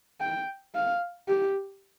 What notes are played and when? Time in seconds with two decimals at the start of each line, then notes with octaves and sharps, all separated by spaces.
0.21 G5
0.75 F5
1.28 G4